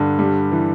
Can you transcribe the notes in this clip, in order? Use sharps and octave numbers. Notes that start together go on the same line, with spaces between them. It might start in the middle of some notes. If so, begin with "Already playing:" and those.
Already playing: G2 D3
G3
E3